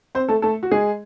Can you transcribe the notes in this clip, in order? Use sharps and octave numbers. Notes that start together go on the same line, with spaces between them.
C4 C5
A3 A4
A3 A4
F#4
G#3 G#4